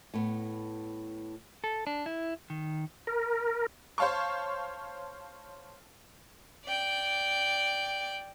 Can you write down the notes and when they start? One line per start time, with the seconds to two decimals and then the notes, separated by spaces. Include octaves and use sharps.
0.14 A2 B3
1.64 A4
1.87 D4
2.06 E4
2.50 D#3
3.07 A#4
3.98 C5 C#5 F5 A5 C#6
6.65 D5 G5